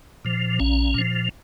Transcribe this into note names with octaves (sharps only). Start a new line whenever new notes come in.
A#2 F3
A#1 C#4
A#2 F3